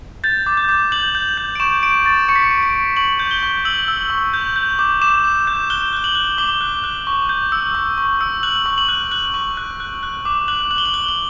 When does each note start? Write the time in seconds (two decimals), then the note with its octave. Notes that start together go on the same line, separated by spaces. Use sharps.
0.24 G6 A6
0.46 D6
0.57 G6
0.69 D6
0.92 G6 F#7
1.15 G6
1.37 G6
1.55 D7
1.60 C#6 E7
1.83 C#6 D7
2.05 C#6 A6
2.29 C#6 C#7
2.36 B6
2.43 C#7
2.51 C#6
2.62 D7
2.74 C#6
2.97 C#6 F#7
3.19 G6
3.31 G7
3.43 C#6
3.65 E6 F#7
3.88 E6
4.10 C#6
4.34 G6
4.56 G6
4.79 D6
5.02 D6 E7
5.24 D6
5.47 G6
5.70 F#6 G7
5.93 F#6 G7
6.04 F#7
6.15 F#6
6.38 D6 G7
6.61 F#6
6.84 F#6
7.07 C#6
7.29 G6
7.52 E6
7.75 C#6
7.98 C#6
8.21 E6
8.43 F#6 F#7
8.66 C#6
8.78 F#7
8.89 F#6
9.11 F#6 F#7
9.34 C#6
9.57 F#6
9.80 F#6
10.03 F#6
10.25 D6
10.48 F#6 F#7
10.71 F#6 F#7
10.78 G7
10.86 F#7
10.94 F#6 G7
11.09 G7